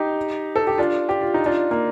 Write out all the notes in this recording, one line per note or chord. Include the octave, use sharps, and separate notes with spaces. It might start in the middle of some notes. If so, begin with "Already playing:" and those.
Already playing: D#4 G4
A4
G4
D4 F4
G4
F4
D#4
D4 F4
A#3